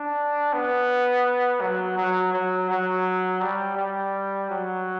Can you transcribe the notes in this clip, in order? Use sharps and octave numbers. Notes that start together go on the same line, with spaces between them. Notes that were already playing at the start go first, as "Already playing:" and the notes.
Already playing: D4
B3
F#3
F#3
F#3
F#3
G3
G3
F#3